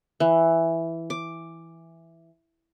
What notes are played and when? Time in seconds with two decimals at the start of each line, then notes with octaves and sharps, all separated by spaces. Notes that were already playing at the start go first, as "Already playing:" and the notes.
0.20 E3
1.10 D6